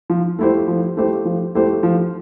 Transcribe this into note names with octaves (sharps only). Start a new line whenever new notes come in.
F3
A3 E4 G4 C5
F3
A3 E4 G4 C5
F3
A3 E4 G4 C5
F3